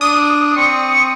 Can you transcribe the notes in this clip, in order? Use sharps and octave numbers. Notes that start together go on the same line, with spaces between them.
D4 D#6
C4 C#6